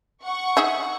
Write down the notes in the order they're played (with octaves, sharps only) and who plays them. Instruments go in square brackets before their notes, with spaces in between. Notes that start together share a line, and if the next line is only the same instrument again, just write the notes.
[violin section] F#5 C#6
[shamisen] D#4 G#4 E5